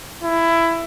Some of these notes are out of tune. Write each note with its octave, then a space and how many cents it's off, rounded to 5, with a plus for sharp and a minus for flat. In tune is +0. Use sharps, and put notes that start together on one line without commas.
E4 +15